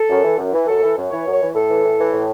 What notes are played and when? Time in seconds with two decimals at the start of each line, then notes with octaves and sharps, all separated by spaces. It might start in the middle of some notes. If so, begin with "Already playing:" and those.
Already playing: A4
0.09 F#2
0.23 E3
0.38 F#2
0.53 E3
0.67 F#2 A4
0.83 E3
0.97 F#2
1.10 E3 C#5
1.26 F#2
1.32 C#5
1.41 E3
1.55 A2 A4
1.69 E3
1.83 A2
1.99 E3
2.13 A2